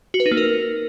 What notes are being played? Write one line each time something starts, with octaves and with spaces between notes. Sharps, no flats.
F#4
B4
D#4
A#3
A#4